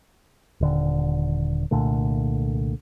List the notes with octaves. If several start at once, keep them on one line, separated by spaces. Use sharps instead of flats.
D#1 D3
C2 A#2 D3 A3